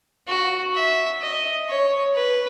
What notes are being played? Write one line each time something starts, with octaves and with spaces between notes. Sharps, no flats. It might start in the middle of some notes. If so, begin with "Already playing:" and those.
F#4
E5
D#5
C#5
B4